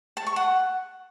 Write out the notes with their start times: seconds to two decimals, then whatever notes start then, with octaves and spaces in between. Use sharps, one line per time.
0.17 A5
0.27 C#6
0.36 F#5